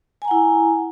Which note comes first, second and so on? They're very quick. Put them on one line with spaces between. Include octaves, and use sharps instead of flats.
G#5 A#5 F#5 E4